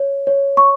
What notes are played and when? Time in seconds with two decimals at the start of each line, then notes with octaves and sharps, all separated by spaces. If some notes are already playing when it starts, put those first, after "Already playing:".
Already playing: C#5
0.27 C#5
0.57 C#6